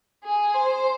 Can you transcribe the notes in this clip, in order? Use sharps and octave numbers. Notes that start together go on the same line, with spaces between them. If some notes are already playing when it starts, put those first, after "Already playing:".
G#4
C5